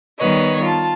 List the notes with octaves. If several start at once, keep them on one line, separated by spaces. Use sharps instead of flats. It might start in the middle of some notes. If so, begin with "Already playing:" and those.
D#3 G3 B3 B4 C#5 D#5
F4 A5